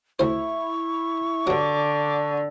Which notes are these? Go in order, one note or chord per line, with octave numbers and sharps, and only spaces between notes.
D2 E4 C5 C#6
G2 D3 F#3 D6